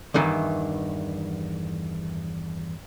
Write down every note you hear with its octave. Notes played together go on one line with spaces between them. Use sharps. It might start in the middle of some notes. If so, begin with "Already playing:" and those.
E2 G2 D#3 E3